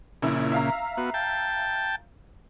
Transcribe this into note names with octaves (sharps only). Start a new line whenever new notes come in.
A#1 A#2 C#3 E4
E5 F5 A#5
B3 F#4
G5 A5